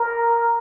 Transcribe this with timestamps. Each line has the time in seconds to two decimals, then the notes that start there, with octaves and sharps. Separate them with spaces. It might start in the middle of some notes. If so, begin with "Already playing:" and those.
Already playing: A#4